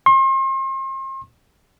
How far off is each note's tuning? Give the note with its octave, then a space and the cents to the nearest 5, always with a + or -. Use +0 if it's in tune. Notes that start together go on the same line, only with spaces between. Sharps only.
C6 +40